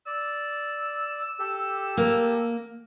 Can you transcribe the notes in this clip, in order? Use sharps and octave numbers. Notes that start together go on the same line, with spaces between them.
D5 E6
G4 A4
A#3